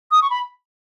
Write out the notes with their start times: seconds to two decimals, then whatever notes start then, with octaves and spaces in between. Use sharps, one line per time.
0.11 D#6
0.22 C#6
0.30 B5